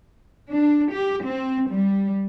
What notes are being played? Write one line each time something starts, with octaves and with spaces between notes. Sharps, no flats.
D4
G4
C4
G3